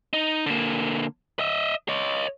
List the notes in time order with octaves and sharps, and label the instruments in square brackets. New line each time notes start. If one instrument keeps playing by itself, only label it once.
[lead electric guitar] D#4
D3 A#3
D#5 E5
C#5 D#5